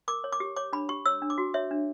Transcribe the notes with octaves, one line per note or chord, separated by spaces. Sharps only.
A#4 D6
C#5
D6
G4
C#5 D6
D4 B5
G4 C#6
C#5 E6
D4
D6
F#4
C#5 E5
D4